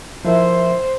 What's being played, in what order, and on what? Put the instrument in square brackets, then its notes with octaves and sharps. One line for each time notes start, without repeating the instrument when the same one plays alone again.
[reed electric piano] F3 A#4 E5 [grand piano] E4 [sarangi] C5